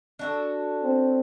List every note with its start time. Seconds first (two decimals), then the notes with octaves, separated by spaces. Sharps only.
0.19 D4 F#4 A4
0.83 C4